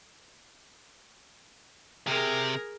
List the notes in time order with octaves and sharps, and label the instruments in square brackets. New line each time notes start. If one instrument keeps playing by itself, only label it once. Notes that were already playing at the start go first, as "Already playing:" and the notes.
[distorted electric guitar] C3 [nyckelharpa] G#4 A#4